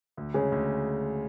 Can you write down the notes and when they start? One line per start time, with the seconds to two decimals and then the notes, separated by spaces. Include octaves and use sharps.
0.17 D2
0.34 C#3 G#3 C#4
0.52 D2